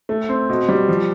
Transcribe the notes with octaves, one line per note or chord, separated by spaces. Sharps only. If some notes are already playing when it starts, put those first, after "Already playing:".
A3
C4
B2
G3
F3